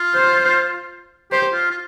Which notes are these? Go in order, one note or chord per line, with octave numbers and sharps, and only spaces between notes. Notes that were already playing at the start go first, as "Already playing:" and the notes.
Already playing: F4
C5
G4 C5
F4
F4